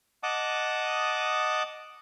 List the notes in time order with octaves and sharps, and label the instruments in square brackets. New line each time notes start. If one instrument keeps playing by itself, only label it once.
[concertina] D#5 F#5 A5 D6 D#6